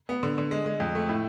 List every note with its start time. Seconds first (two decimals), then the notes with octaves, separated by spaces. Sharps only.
0.09 B3
0.23 D3
0.38 D3
0.51 G#3
0.66 G#3
0.80 F2
0.95 A3
1.09 A2